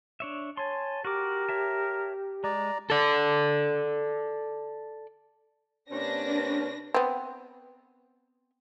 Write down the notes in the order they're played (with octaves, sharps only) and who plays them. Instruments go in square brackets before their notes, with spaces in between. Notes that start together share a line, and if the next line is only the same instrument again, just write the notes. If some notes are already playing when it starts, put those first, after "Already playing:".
[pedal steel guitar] D4 C#5 E5
[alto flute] C#5 [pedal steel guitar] G#5 C6 [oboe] A5
[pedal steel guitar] F#4 D6 [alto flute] G4 [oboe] A#4
[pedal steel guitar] C#5 E5 A5
[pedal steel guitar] G#3 [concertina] D5 A#5
[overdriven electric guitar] A4 D5
[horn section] C3 A#3 C#4 [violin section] D4 B4 A#6
[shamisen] B3 C4